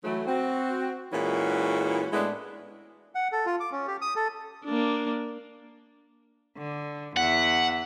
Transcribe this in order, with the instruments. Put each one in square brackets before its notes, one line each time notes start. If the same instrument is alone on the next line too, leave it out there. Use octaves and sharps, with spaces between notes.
[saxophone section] E3 F#3 A3
C4 F#4
A#2 E3 G#3 C#4 E4 F#4
A2 G#3 B3 D4 E4
[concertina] F#5
A4
F4
D6
C#4
G4
D#6
A4
[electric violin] A#3 D4
[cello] D3
[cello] E2 E5 [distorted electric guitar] F#5